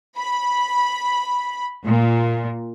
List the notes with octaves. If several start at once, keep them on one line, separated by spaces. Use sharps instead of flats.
B5
A#2